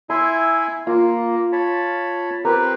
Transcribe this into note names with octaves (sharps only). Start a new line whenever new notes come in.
E4 E5 G#5 C6
A#3 F4
C#5 A5 B5
C4 G4 A#4 B4